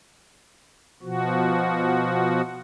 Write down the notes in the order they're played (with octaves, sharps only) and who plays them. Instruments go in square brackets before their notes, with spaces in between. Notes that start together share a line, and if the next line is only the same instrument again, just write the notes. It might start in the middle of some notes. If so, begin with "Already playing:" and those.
[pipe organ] B2 F3 F#4